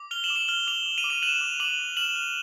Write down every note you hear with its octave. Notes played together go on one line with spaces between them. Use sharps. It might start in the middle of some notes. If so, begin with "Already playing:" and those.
Already playing: D6
F6 F7 G7
E7 F#7
D6
E7 F#7
F6 G7
D6 F7 G7
D6
D#7 F7
D6
D#7 F7
F#6 E7 F#7
D6
D6 E7 F#7
D6
F6 E7 F#7
F6